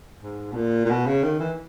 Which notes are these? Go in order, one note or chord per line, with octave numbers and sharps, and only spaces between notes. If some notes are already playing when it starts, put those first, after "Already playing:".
G#2
B2
A#2
A#2
B2
C#3
D#3
E3